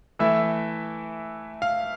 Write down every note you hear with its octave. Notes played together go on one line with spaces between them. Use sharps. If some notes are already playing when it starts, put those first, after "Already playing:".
E3 A3 E4 E5
F5